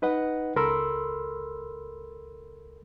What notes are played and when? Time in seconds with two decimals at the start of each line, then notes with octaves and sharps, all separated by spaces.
0.02 D#4 B4 D#5 F#5
0.56 C#2 A4 A#4 B5 C6 E6